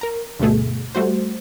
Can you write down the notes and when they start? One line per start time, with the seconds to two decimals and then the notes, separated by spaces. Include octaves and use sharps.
0.01 A#4 A#5
0.39 D2 G2 B2 A3 G#4
0.95 G3 A3 F#4 C5